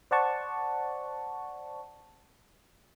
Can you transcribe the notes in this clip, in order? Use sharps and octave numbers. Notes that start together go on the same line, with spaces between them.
C5 D5 F#5 A5 C#6